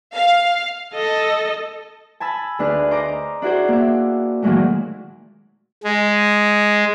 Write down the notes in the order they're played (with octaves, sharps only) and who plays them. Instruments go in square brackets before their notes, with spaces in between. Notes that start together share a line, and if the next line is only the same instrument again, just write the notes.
[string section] F5
[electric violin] A4 D#5
[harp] G#5 A5 B5 E6
D2 D4 G#4 B4 F6
C5 D#5 A#5 D6
D4 E4 F#4 G#4 C5
A#3 E5
A#2 D#3 E3 F#3 G#3 A3
[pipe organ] G#3